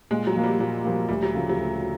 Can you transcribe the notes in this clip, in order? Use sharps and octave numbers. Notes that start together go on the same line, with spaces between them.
A#2 G#3
F#3
F3 A#3
G3
A#2 F#3
F3 A#3
D2 G3
F#3
C#3 F3 A3
F#3
D2